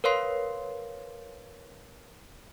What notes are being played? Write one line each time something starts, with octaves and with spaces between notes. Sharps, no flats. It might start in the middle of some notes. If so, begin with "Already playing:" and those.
A#4 B4 C#5 F5 C6 C7